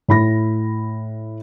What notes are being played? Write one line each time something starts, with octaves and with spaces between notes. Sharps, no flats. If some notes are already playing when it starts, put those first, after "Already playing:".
A2 B5 A#6